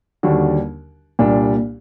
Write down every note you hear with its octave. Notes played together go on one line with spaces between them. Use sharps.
D#2 D3 G3 D4 F#4
C2 A#2 G3 D4